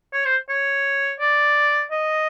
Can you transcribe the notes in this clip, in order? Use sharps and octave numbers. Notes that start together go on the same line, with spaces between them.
C#5
C5
C#5
D5
D#5